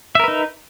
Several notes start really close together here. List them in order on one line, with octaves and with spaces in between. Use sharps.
E5 A#4 B4 D#4